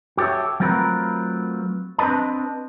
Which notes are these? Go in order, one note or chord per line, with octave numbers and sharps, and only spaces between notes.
F#4 G4 A4 C#5 E5
F#3 A3 C4 F4 A#4 B4
C4 D4 B4 D#5 A5